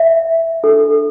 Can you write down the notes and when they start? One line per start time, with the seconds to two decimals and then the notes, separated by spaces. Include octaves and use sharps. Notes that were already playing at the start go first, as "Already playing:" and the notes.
Already playing: E5
0.63 D4 A4